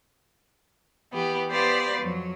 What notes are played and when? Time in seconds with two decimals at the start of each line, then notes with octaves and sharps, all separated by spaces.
1.12 E3 B3 G4
1.50 B3 G4 B4 C5 D5 F5
2.00 F2 F#3